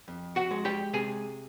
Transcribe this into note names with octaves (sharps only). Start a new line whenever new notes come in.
F2
F#4 F#5
G#3
G4 G5
C3 G#4 G#5